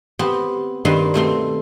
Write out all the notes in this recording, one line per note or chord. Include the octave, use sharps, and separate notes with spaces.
B3 C4 G4
G2 D#3 A#3 C4 B4 C5
B2 A3 C4 C6